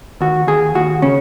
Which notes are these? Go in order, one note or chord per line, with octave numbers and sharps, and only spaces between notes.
D#2 F#4
D#2 G#4
D#2 F#4
C#3 C#4